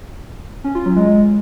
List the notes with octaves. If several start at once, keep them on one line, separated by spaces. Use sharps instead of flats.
C#4
F4
F#3
G#3